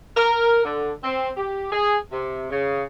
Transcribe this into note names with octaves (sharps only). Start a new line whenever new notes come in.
A#4
D3
C4
G4
G#4
C3
C#3